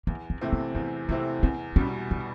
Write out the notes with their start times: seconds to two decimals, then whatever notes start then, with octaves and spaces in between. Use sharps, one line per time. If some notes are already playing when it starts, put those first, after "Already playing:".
0.07 E2 A#3
0.30 C4
0.41 C3 E3 A3 C4
0.53 B3
0.75 E2 B3
1.09 C3 E3 A3 A#3 C4
1.43 E2 C4
1.76 B2 G3 C#4
2.11 D4